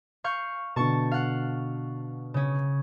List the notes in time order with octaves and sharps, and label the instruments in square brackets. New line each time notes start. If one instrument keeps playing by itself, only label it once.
[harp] F5 C#6 G6
[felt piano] B2 D3 [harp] A5 C#6
[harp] F5 F#5
C#3 C#4